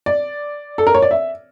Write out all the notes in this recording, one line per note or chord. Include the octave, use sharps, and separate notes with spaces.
D5
A4
A#4
C#5
D5
E5